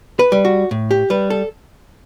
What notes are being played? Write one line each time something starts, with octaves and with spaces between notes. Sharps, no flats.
B4
G3
F#4
A2
G4
G3 B4
A4